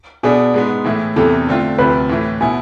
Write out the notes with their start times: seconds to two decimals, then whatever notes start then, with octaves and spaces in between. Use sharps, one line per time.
0.23 B2 B3 D4 G#4
0.54 G#2 G#3 B3
0.84 A2 E3 A3 E4
1.16 E2 C3 E3 B3 A4
1.47 D3 A3 C4 F4
1.78 D2 C3 F3 B4
2.09 A2 E3 A3
2.40 B2 B3 E4 G#5